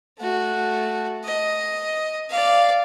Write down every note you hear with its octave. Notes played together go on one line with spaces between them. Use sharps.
A3 F#4
D#5
D5 F5